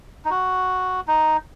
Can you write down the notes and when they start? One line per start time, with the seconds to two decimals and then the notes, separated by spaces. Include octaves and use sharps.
0.25 D#4
0.30 F#4
1.08 D#4